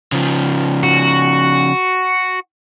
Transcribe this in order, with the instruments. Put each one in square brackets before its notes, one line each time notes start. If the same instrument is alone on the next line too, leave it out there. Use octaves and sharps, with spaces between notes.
[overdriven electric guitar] C#3 F3
[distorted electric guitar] F#4